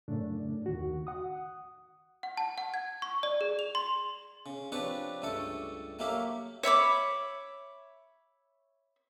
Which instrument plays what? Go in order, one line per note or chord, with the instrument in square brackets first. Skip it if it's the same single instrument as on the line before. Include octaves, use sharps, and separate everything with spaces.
[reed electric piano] F#2 A2 C#3 A3 D4
D#2 D#3 F#4
F#5 D#6
[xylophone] F#5
A5
F#5
G#6
C#6
D5
G#4
F7
C6
[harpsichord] C#3
F3 C4 D4 G4 B4 C#5
C#2 G2 A3 A4 C#6
F#3 A3 A#3 G4 E5 F5
[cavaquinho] C#5 E5 B5 D6